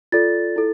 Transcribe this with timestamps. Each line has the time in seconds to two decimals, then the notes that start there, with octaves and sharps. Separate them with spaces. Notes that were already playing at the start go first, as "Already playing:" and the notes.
0.12 F4 A4 D5 A6
0.56 E4 A4